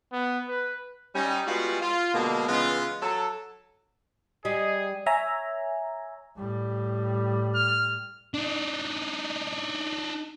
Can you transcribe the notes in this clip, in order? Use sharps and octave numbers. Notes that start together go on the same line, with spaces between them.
B3
B4
G3 C#4 D#4
G3 G#3 B3 F4 F#4 F5
F4
B2 D3 G#3 A#3
C#3 E3 G#3 B3 F4
F#3 A4
G3 G#4 D#5
C#5 E5 G#5 A#5
A2 G3
F6
D4 D#4